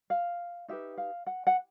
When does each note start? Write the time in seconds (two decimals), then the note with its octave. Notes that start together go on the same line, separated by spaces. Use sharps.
0.10 F5
0.68 D#4 G4 B4 E5
0.98 F5
1.26 F#5
1.47 F#5